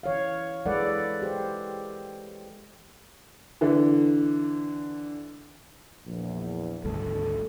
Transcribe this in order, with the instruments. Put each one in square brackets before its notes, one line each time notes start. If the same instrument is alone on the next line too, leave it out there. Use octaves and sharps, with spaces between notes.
[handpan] E3 C#5 F5
E3 G#3 A4 B4 D5 F#5
G4 C5
[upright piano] D3 E3
[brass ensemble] A#1 E2
[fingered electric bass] G#1 D2 G3 [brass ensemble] A4